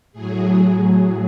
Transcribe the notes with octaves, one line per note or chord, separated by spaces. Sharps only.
A2 F#3 G#4
G#4